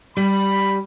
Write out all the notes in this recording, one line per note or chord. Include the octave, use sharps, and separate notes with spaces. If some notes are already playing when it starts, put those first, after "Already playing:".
G3 B5